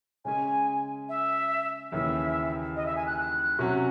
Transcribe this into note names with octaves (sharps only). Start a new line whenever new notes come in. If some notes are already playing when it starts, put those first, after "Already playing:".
C#3 G#3 C#4 G#4 G#5
E5
D#2 C#3 E3 E5
D#5
E5
G#5
F#6
F#6
C3 F#3 C#4 F#4